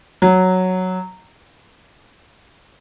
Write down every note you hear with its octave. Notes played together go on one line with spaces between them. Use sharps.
F#3